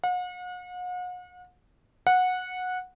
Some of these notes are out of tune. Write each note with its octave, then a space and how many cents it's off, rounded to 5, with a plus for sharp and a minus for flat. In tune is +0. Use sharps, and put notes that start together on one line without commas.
F#5 -40
F#5 -15